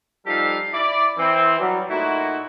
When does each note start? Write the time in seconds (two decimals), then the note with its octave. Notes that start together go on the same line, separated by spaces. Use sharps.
0.26 F3 G3 D#4 G4 A4 F5
0.73 E4 D5
1.18 E3 C4
1.59 F#3 G3
1.89 A#2 A3 D#4 E4 F#4